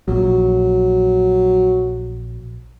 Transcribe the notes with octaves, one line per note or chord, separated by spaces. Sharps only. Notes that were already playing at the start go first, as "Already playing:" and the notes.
A#1 F#3